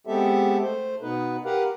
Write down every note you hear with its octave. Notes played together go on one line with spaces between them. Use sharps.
G#3 B3 C4 G4 A4 E5
A3 C5
B2 B3 D#4 B4
G4 A#4 B4 F5 F#5